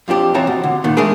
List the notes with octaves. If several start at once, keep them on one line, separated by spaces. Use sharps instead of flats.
F2 F3 D4 G4
F2 E3 C4 C#5 A5 A#5
B2
D3
A#2 D#3 B3
E3 G#3 A3 D4 G#4 A#4